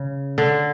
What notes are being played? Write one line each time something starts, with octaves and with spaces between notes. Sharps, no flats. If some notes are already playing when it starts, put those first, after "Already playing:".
Already playing: C#3
D3